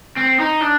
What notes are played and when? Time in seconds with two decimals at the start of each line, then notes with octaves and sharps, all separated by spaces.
0.17 C4
0.40 D#4
0.61 D4